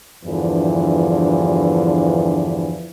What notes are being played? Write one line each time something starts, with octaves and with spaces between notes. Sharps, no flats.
E2 G2 D3 E3 F3